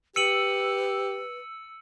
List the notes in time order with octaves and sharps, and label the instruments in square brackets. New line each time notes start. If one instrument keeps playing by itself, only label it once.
[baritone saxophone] G4 [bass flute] B4 [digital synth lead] E6 [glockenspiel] C#7 D#7 F#7